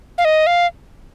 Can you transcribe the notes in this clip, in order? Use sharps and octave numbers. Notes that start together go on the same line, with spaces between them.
F5
D#5
F5